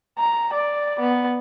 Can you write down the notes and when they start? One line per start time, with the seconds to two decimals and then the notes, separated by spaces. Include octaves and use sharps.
0.19 A#5
0.54 D5
1.00 B3